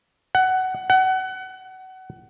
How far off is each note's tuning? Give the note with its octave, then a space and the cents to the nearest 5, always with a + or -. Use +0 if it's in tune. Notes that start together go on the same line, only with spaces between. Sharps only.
F#5 +15
F#5 +25